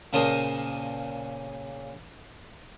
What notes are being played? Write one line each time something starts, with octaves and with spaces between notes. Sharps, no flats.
A#2 C#3 A#4 C5 A5 D#6